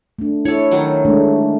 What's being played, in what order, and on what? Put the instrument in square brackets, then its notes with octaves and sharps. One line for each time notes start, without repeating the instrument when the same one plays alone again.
[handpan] A3 D4
[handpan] E4 [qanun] A4 C#5
[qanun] D#3 F#3
[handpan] G#3 A3 D4